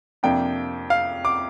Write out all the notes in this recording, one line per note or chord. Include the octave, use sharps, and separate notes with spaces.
F2 C3 F3 A#3 D4 G5
F5
D6